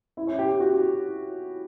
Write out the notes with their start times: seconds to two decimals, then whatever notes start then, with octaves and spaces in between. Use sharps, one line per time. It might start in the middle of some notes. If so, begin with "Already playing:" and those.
0.17 E4 E5
0.27 C#4 C#5
0.39 G4
0.49 G4
0.60 F#4